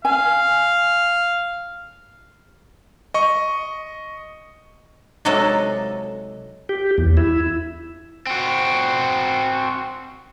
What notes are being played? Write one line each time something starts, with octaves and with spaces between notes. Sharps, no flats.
F5 G#5
D#5 C#6
C3 F#3 G#3 D#4 A4
G4
E2
E4
C4 F#4